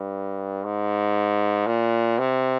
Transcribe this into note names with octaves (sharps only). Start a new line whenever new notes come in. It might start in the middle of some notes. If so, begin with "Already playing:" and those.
Already playing: G2
G#2
A#2
C3